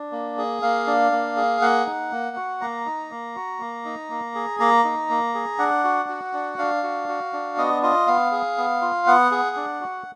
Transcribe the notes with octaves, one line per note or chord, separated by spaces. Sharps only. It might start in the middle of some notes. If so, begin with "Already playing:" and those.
Already playing: D4
A#3
G#4
A#3 F5
D4
A#3
G#4
A#3 F#5
D#4
A#3
F#4
A#3 A#5
D#4
A#3
F#4
A#3
D#4
A#3
G#4
A#3 A#5
D#4
A#3
G#4
D4 F#5
F#4
F#4
D4
D4 F5
F#4
F#4
D4
B3 D#5
F4 D#5
B3 F5
G#4
B3
F4
B3 F#5
G#4
D4
F#4